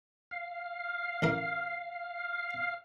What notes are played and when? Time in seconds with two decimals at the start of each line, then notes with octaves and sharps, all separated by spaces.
0.31 F5
1.22 A1 E3 A#4